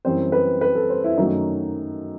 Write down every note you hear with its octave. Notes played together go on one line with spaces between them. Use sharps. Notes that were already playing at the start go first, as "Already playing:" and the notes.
F#2 E3 G3 C4 C5
B4
B4
A4
C5
E4
F#2 D#3 F#3 A3 D#4